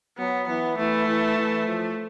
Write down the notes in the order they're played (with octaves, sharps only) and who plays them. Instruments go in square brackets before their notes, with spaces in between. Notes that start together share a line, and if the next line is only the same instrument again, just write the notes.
[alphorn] F#3 [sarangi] B3
[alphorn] E3 [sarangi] B3
[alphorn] E3 [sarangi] A3
[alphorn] E3
E3
F3